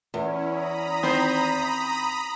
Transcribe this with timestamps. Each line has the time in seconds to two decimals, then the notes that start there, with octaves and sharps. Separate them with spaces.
0.14 E2 C#4 E4
0.46 A#5 B5 D#6
1.03 D#3 C4 C5